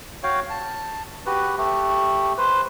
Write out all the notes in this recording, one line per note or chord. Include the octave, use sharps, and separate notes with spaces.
F#4 C#5 F5 G5
A5
F#4 G4 B4
A3 G4
B4 C5